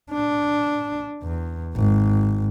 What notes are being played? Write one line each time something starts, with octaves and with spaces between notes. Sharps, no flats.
D4
E2
G#1